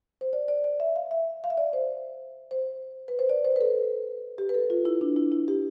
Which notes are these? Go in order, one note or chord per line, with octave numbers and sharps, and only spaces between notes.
C5
D5
D5
D5
E5
F5
E5
F5
E5
D5
C5
C5
B4
C5
D5
C5
B4
A4
G4
B4
A4
F4
E4
D4
E4
E4
G4